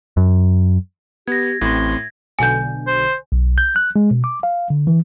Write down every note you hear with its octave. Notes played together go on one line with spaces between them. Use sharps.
F#2
B3 G4 G#6 A#6
A1 A2 C4 C6 G#6 A#6
B1 B2 D3 G#5 G6
C5
B1
G6
F#6
G#3
B2
D6
F5
D3
E3